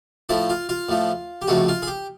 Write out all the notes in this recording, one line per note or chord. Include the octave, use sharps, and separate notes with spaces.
A2 F3 A3 E4
F4
F4
A2 F3 A3
G4
C#2 C3 F3 A3 F#4
F4
G#4
G4